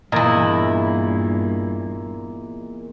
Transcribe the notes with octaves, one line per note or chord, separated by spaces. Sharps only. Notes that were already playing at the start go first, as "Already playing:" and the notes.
E2 G2 A#2 A#3 E4 D#5